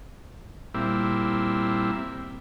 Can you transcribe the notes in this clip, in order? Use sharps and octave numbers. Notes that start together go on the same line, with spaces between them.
A#2 G3 C4 E4